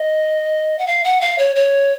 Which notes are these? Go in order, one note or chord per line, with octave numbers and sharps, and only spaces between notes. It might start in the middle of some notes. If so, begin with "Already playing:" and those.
Already playing: D#5
F#5
F5
F#5
F5
C#5
C#5